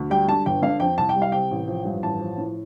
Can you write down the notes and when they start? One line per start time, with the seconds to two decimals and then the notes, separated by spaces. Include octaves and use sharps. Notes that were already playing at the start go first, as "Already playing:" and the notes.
Already playing: D2
0.10 G3 G5
0.28 D3 A5
0.46 G1 G5
0.62 D3 F5
0.80 F2 G5
0.98 C2 A5
1.09 G5
1.16 G3
1.22 F5
1.32 C3 G5
1.51 A1
1.68 F3
1.85 G2
2.03 A1 A5
2.20 F3
2.38 A2